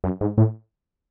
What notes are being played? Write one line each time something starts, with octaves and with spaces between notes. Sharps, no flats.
F#2
G#2
A2